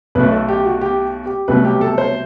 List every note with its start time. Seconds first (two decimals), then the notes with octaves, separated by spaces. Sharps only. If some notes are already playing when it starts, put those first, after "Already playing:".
0.15 B1 B2 A3 B4
0.32 A4
0.48 G4
0.65 F#4
0.81 G4
1.26 G4
1.48 C2 B2 F#3 A3 B4
1.65 G4
1.81 A4
1.98 C5